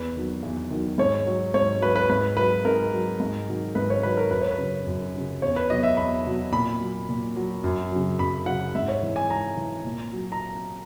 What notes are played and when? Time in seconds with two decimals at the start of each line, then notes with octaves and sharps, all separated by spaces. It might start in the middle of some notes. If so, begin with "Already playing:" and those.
Already playing: E2 B4
0.16 D#3 F#3
0.43 E2
0.70 D#3 F#3
0.98 G#2 C#5
1.26 F#3
1.54 G#2 C#5
1.81 F#3 B4
1.96 B4
2.09 G#2 B4
2.37 F#3 B4
2.65 G#2 A#4
2.93 F#3
3.20 G#2
3.49 D#3 F#3
3.75 G#2 B4
3.90 C#5
4.03 D#3 F#3 B4
4.17 A#4
4.31 F#2 B4
4.41 C#5
4.51 B4
4.58 C#3 F#3
4.87 F#2
5.14 C#3 F#3
5.42 E2 C#5
5.56 B4
5.70 B2 F#3 D#5
5.83 E5
5.97 E2 B5
6.26 B2 F#3
6.53 A#2 B5
6.80 F#3
7.09 A#2
7.36 F#3
7.64 F#2
7.92 C#3 F#3
8.19 F#2 B5
8.46 C#3 F#3 F#5
8.75 G#2 E5
8.88 C#5
9.03 E3
9.16 G#5
9.30 G#2 A#5
9.57 E3
9.85 A#2
10.13 F#3
10.32 A#5